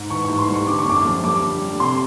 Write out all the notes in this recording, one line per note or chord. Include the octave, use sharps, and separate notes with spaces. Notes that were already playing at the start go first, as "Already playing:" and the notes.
Already playing: G#2
E3 C#6
G#2 C#6
C6
G3
C#6
D3 D6
C#6
F#2 D6
F3
G3 D6
D3
G3
C3 C6